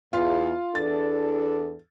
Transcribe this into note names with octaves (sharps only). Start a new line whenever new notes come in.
E2 F4 F5
E2 D4 A4 A6